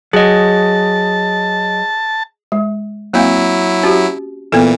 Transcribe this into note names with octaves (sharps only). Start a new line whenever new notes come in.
F#3 G#4 D#5 A5
G#3
F#3 A#3 C4 E4 F5
C#4 F#4 G4
A#2 E3 B3 A4